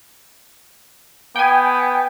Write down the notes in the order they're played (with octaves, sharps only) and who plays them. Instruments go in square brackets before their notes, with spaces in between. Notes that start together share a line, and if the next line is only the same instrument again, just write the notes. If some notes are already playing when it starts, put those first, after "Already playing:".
[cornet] B3 [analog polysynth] G5 G#5